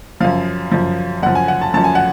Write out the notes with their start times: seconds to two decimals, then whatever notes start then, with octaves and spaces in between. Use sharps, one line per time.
0.21 F#2 F3 F5
0.72 F#2 F3
1.23 F#2 F3 F#5
1.35 G#5
1.48 F#5
1.61 A5
1.74 F#2 F3 A5
1.84 G#5
1.95 F#5